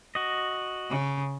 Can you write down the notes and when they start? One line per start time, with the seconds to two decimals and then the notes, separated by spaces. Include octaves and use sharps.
0.15 F#4 D#5
0.90 C#3